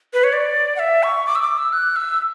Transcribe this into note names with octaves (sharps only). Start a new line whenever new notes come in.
B4
C#5
D5
F#5
E5
C#6
D6
E6
D6
E6
F#6
E6